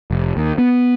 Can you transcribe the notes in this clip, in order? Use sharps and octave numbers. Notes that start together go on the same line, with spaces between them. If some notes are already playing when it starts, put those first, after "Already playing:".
F1
D#2
B3